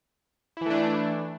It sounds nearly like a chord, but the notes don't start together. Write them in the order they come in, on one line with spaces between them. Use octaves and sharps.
E4 E3 A3 D4